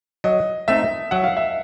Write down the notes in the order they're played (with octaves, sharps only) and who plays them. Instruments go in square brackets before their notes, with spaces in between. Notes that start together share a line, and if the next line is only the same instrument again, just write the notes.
[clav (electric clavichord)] F#3 [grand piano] D#5
[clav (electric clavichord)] A3 C4 D#4 [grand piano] E5
[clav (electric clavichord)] F#3 [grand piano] F#5
[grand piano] F5
E5